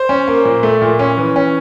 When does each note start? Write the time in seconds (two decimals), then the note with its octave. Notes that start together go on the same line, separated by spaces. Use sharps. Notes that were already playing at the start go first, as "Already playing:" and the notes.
Already playing: C5
0.09 C#4
0.28 A#3
0.45 A#2
0.63 A3
0.82 A#2
0.99 C#4
1.17 E3
1.36 C#4